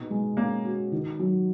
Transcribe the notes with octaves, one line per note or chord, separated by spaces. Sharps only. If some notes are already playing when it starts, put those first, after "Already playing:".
Already playing: B2 A#3 D#4
G#3
A#3 C#4
F#4
D#3
F#3